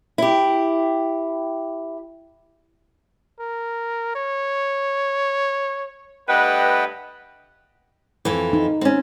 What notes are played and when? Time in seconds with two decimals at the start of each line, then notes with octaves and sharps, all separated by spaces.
0.18 E4 G4
3.40 A#4
4.15 C#5
6.29 G2 A3 B4 D#5 F#5 G5
8.25 F2 E3
8.53 D#4
8.81 C4 C#4